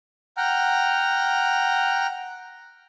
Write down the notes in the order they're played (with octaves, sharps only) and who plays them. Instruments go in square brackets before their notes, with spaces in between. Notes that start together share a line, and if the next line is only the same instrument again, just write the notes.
[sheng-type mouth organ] F#5 G5 A#5 F6